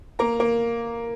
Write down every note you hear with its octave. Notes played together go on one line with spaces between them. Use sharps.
A#3 A#5
A#3